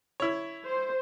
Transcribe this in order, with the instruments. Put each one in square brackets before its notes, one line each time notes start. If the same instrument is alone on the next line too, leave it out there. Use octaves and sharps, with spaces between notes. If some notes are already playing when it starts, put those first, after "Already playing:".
[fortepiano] E4 C#5
[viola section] C5